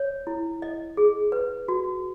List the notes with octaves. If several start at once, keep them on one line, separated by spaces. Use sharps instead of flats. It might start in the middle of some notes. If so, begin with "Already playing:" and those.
Already playing: C#5
E4
D#5
G#4
B4
F#4